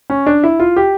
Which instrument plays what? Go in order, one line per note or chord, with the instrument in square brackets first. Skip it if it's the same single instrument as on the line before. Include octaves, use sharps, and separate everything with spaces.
[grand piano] C#4
D4
E4
F4
G4